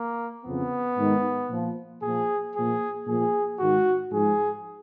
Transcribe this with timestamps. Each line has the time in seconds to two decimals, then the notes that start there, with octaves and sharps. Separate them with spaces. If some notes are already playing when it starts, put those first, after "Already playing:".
Already playing: A#3
0.44 F2 C#3 F3 B3
0.97 G#2 D#3
1.49 A#2 F3
2.02 A#2 F3 G#4
2.54 A#2 F3 G#4
3.07 A#2 F3 G#4
3.59 G#2 D#3 F#4
4.12 G#2 F3 G#4